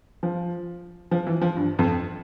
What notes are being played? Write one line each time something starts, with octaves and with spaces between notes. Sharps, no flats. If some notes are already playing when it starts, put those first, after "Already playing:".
F3
F3
E3
F3
G2
F2